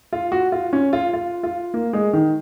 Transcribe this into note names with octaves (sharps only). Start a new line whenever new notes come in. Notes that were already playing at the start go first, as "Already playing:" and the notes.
F4
F#4
F4
C#4
F4
F4
F4
A#3
G#3
D#3